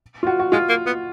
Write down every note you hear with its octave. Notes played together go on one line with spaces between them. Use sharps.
F4
F#4
F#4
G#3 F4
A#3
B3